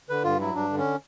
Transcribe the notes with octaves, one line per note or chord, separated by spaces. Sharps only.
D3 B4
G2 F4
F#3 E4
G2 D4
D3
C#4